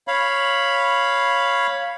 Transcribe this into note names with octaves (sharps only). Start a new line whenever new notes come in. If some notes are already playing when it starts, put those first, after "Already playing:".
C#5 F5 B5